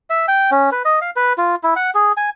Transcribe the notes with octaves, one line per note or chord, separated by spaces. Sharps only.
E5
G5
C#4
B4
D#5
F5
B4
F4
E4
F#5
G#4
G#5